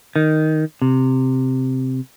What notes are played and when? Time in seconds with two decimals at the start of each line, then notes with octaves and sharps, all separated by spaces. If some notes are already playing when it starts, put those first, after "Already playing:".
0.16 D#3
0.82 C3